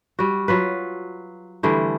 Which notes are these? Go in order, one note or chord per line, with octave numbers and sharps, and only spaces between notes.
G3 F#4
F#3 F4 B4
D3 E3 G3 A3